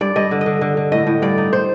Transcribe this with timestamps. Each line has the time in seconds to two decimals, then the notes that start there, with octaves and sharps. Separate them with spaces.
0.01 G2 D5
0.16 G2 D#5
0.31 D3
0.41 D#5
0.46 D3
0.61 D3
0.77 D3
0.92 A2 D#5
1.07 A2
1.22 G2 D5
1.38 D#4
1.53 C5